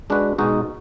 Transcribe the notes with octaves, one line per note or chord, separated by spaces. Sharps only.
G#3 D4 F#4 B4
B2 G#3 D#4 F#4